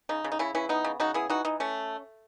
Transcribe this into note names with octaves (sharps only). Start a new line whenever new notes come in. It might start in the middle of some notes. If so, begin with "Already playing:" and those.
C#3 D#4
C#3
D#4
C#3 C#4 E4
E3 C#4 E4
B3 D#4
C#3
C#3 D#4 F#4
B3 E4 G#4
E3 D#4 F#4
E3 D#4
A3 C#4